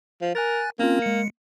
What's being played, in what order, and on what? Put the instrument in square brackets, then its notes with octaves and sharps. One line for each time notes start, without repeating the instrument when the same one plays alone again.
[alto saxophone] F3
[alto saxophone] A#4 [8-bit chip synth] G#5 F#6 A6
[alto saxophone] A#3 [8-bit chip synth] C4 C#4 F4
[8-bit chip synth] G#3 C#7